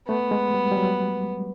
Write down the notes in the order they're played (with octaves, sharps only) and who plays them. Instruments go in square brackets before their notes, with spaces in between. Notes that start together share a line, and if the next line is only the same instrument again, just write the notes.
[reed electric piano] A3 [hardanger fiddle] B3
[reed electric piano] G#3
G3
G3
F#3